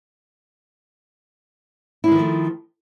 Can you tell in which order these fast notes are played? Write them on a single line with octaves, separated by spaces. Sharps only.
E4 G#3 D#3 F3 A3